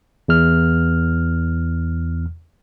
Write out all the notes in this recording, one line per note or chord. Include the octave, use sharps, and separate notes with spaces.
E2 F6